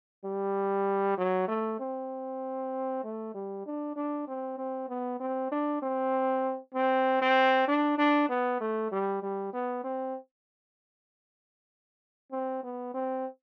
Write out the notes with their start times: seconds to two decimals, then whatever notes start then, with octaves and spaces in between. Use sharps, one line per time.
0.25 G3
1.18 F#3
1.48 A3
1.80 C4
3.04 A3
3.34 G3
3.66 D4
3.96 D4
4.28 C4
4.58 C4
4.88 B3
5.20 C4
5.51 D4
5.82 C4
6.74 C4
7.21 C4
7.68 D4
7.98 D4
8.29 B3
8.61 A3
8.92 G3
9.23 G3
9.53 B3
9.84 C4
12.32 C4
12.63 B3
12.94 C4